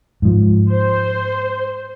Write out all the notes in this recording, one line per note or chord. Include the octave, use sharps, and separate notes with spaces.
G#2 F3
C5